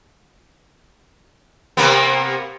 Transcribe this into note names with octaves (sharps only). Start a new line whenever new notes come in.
C3 A#3 B3